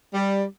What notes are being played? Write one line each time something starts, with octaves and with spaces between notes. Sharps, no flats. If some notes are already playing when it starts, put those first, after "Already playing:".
G3